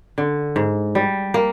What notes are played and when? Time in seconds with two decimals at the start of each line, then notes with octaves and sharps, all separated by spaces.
0.18 D3
0.56 G#2
0.95 G3
1.34 A#3